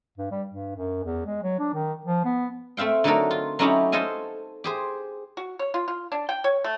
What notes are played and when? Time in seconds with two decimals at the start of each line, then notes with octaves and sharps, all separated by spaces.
0.18 G2
0.31 G3
0.49 G2
0.76 F#2
1.04 E2
1.26 G#3
1.43 F#3
1.59 D4
1.74 D#3
2.05 F3
2.25 B3
2.77 A3 C4 E5 F5 G5
3.04 D3 F#3 A3 D#4 A4 A#4
3.31 F4
3.59 F#3 A3 C#4 D#4 E4 G4
3.92 A4 C5 D#5 F5 G#5
4.64 G4 G#4 C5
5.37 F#4
5.59 C#5
5.74 F4
5.88 F4
6.12 D4
6.29 G5
6.44 C#5
6.64 A3